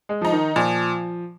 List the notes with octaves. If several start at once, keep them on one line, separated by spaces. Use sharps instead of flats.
G#3
F3 D#4
D#3
A#2 F3